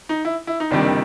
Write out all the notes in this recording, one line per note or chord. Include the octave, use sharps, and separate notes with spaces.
D#4
E4
E4
D#4
F#1 F2 C3 D#3 G3 D4